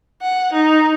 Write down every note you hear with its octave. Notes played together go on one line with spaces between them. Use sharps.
F#5
D#4